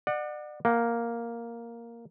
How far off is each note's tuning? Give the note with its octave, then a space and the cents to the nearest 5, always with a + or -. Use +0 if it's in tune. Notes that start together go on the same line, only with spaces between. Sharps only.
D5 +35 F#5 -10
A#3 +0 F#5 +45